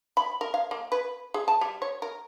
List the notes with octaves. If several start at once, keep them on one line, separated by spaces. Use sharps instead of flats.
B5
A#4
F5
A#3
B4
G#4
A5
G3
C#5
A#4